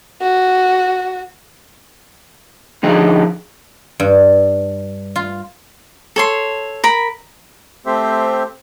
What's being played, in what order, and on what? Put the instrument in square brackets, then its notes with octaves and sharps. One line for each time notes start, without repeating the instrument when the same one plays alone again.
[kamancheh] F#4
[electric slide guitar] D3 F3 D#4 G#4
[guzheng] G2
F4
[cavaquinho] A4 C#5 C6
A#4 B5
[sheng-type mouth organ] A3 C4 G4 C5 E5